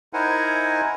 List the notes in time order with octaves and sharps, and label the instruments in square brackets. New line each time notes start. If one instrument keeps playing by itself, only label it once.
[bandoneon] D#4 E4 A#4 C5 F#5 G#5